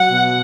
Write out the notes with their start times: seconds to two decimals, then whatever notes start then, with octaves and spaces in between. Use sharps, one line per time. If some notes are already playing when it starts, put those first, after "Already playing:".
Already playing: F#3 F#5
0.10 B2